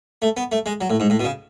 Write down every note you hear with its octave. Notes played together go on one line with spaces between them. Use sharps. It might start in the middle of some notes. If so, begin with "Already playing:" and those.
A3
B3
A3
G#3
F#3
A2
G#2
A2
B2
C#3